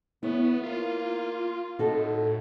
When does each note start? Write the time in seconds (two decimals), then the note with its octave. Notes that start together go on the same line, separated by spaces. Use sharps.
0.23 E3 B3 E4 C#5
0.63 A#3 F4
1.79 A2 D#4 F#4 A4